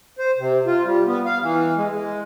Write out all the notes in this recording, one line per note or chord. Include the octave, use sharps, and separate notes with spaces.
C5
C3
F4
G3
B3
F5
E3
G#3
G#3